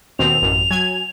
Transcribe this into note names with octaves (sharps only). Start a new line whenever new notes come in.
D#2 B2 C4 F7
A1 F#2
F#3 G#5 G#6